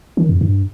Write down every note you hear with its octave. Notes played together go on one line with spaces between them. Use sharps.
D#3
F2
G2